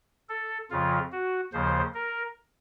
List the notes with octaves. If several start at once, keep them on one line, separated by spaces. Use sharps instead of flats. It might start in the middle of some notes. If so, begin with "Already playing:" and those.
A4
F2 C#3 F3 F4
F#4
D#2 C#3 F3 C5
A#4